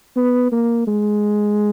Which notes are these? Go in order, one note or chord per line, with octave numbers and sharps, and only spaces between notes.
B3
A#3
G#3